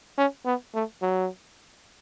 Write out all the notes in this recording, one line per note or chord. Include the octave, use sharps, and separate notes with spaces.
C#4
B3
A3
F#3